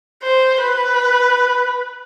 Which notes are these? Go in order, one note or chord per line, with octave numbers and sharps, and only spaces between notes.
C5
B4